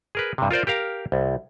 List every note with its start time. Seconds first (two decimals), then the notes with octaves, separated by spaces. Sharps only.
0.15 G#4 A#4 B4
0.38 G2 C3
0.51 F4 A#4 C5 D5
0.67 G4 A#4 F5 A#5
1.12 C2